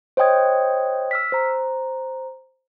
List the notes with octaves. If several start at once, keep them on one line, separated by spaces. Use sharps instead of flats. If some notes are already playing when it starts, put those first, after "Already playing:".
C5 C#5 D#5 G5 D#6 G#6
E6 F6 B6
C5 A#5